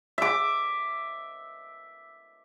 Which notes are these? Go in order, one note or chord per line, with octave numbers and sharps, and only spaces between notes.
E5 D6